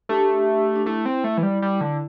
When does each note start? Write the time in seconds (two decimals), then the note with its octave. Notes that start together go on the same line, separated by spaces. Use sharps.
0.09 A3 D4 G4
0.76 D4
0.86 A3 E4
1.06 C4
1.24 A3
1.38 E3
1.43 G3
1.62 G3
1.81 D3